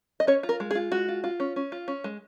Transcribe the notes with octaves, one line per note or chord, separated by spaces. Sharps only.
D#5
C#4 C#5
F4
A#4
G#3
G#4
F4
G#3 F#4
F4
F4
C#4
C#4
F4
C#4
G#3